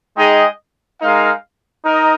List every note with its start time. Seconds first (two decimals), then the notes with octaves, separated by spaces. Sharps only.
0.15 G#3 D#4 G#4 D#5 G5
1.01 G#3 D#4 A#4 F5
1.85 D#4 A#4 D#5